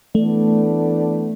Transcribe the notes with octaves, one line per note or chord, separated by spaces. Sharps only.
E3 A3 B3 D4 A4 D5